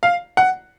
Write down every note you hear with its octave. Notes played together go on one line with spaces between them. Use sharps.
F5
F#5